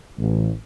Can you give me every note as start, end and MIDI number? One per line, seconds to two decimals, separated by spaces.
0.19 0.50 33